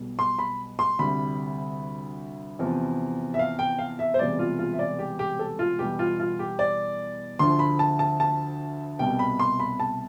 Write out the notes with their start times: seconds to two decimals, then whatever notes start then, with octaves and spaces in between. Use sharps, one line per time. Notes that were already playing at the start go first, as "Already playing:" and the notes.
Already playing: B1 B2 G3
0.19 C6
0.39 B5
0.79 C6
0.99 D2 C3 G3 B5
2.59 E2 C3 F3
3.34 E5
3.39 F5
3.59 G5
3.79 F5
3.99 E5
4.14 C5
4.19 E1 E2 C3 G3 D5
4.39 F4
4.59 F4
4.73 E5
4.79 D5
4.99 G4
5.19 G4
5.39 A4
5.59 F4
5.79 E2 B2 G3 G4
5.99 F4
6.20 F4
6.39 G4
6.59 D5
7.39 D2 D3 F3 C6
7.59 B5
7.79 A5
7.99 A5
8.20 A5
8.99 C2 B2 G3 G5
9.19 B5
9.39 C6
9.60 B5
9.80 A5